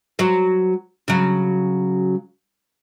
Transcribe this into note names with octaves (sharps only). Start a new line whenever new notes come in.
F#3 C5
C#3 F#3